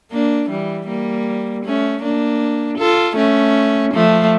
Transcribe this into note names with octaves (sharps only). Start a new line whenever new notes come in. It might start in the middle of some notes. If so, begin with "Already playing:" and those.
A#3 D4
E3 G3
G3 A#3
A3 C#4
A#3 D4
F4 A4
A3 C#4
F3 A3